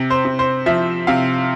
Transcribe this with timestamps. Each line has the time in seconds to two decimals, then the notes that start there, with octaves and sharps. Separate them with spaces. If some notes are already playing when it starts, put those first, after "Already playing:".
Already playing: C3
0.10 C5
0.25 C3
0.39 C5
0.66 F3 E5
1.07 C3 F5